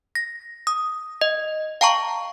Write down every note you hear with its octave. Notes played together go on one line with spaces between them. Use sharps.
A#6
D#6
D#5
F5 G5 A5 A#5 C#6